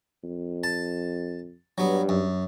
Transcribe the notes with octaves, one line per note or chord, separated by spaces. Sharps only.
F2
A5
G2 F#3 B3
F#2